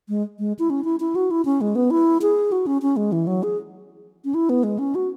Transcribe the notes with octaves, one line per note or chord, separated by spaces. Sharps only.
G#3
G#3
E4
C#4
E4
E4
F#4
E4
C#4
G#3
B3
E4
G#4
F#4
C#4
C#4
G#3
E3
F#3
G#4
C#4
E4
B3
G#3
C#4
F#4